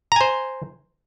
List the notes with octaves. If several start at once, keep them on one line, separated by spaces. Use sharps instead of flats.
C5 G#5 A#5